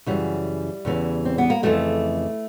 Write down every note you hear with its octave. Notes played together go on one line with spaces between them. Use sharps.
F#2 C#3 E3 G3
E2 C#3 E3
C4
B3
A#3
F2 C#3 E3 A3